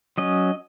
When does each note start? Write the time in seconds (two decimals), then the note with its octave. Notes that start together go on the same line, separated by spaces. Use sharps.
0.18 F#3 C#4 D#5